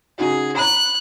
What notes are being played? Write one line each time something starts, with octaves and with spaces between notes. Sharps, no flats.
C#3 D#4 F#4 G#4
C#5 A#5 B5 F#6